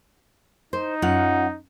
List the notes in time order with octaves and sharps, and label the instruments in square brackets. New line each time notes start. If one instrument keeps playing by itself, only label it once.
[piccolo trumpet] D#4 [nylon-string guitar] C5
[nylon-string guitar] F#2 F4 F#5